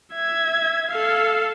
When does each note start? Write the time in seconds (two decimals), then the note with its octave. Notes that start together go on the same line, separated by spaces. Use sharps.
0.14 E5 G#6
0.88 A4 F5